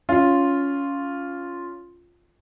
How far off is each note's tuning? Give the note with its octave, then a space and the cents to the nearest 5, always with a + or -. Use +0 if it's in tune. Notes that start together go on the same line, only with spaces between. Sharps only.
C#4 +15 F4 +0